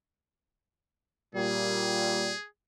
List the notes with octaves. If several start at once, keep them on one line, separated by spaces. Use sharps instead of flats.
A#2 G3 G#4